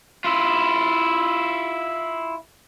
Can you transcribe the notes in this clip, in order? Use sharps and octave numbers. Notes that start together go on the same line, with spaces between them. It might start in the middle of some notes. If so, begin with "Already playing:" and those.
E4 F4